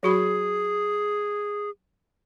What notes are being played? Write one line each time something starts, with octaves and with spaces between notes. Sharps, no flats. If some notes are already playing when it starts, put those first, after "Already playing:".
F#3 F#4 G#4 B5